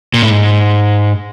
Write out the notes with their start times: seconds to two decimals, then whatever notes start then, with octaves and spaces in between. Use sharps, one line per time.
0.14 A#2
0.23 A2
0.31 G#2